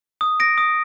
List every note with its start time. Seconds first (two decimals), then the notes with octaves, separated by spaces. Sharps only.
0.21 D#6
0.40 A#6 D7
0.58 D#6